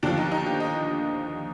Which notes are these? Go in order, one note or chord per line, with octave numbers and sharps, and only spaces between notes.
D#2 D3 F3 D4
D#4
D#4
G4
D#5